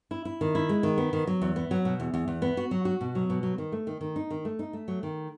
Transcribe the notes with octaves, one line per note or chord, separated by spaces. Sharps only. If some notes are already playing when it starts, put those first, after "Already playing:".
E4
E4
D#3
E4
G#3
D#3
B3
D#3
F#3
E2
B3
F#3
B2
E2
E2
E2
B3
F#4
F#3
F#4
B2
F#3
B2
F#3
D#3
A3
D#3
D#3
D#4
D#3
A3
D#4
A3
F#3
D#3